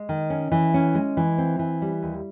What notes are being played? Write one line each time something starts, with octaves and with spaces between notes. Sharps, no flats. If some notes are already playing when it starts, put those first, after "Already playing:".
Already playing: G#3
D#3
C#4
E3
C#4
G#3
E3
C4
E3
G3
D#2